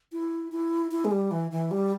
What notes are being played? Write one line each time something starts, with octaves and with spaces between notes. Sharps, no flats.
E4
E4
E4
G#3
G3
E3
E3
G3